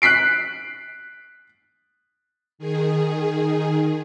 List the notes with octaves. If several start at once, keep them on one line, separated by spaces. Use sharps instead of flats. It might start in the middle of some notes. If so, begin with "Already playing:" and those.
F#6 B6 C7 D7
D#3 G#4